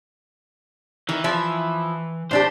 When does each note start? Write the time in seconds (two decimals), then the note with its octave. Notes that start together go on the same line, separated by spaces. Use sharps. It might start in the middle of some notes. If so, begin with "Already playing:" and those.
1.09 D#3 E3
1.24 F3 E4
2.31 A2 D4 G4 C5